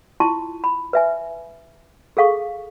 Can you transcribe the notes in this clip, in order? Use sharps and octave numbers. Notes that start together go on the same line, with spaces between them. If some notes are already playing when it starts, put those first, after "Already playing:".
E4 F4 A5 C6 C#6
B5
B4 E5 G#5
G#4 A4 F5 C#6